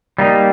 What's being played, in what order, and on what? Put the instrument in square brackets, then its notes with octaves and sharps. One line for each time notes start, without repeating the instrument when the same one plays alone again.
[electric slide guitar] G3 A#3 D#4